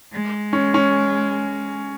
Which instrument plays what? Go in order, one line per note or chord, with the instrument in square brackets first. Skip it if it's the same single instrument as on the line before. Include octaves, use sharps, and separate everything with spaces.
[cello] G#3
[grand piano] C#4
C#4